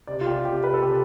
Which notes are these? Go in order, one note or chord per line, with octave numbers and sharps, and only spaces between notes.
C3 D5
F4
G4
C3 G4
B4
A4
C3 G4